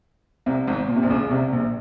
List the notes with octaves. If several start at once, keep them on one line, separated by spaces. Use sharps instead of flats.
C2 C3
G#1 G#2
A#2
C3
A#1 A#2
C#2 C#3
C2 C3
A#1 A#2